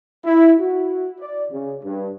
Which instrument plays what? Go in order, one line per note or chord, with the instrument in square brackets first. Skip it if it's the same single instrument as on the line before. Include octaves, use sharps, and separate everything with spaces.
[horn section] E4
F#4
D5
C#3
G2